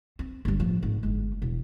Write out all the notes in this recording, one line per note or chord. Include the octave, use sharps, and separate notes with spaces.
C4
G1 G3
A2 F3
G#1
G1 G#3
E1